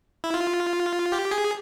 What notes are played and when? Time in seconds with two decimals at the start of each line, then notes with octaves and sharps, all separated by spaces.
0.24 E4
0.34 F4
1.12 G4
1.31 G#4